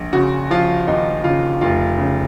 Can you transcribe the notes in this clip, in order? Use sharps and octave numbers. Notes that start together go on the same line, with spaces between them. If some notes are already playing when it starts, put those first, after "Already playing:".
Already playing: A#1
C#3 F#4
F3 F4
D#2 D#4
C#3 F4
F1 F4
C#3